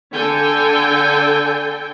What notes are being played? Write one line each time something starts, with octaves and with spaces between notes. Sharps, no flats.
D3 A4 G5 G#5